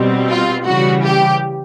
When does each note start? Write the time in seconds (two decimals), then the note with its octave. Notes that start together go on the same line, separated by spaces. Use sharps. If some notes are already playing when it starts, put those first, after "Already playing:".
Already playing: B2 G3 C4
0.30 F4
0.66 C#3 E3 G3 F#4
1.04 G4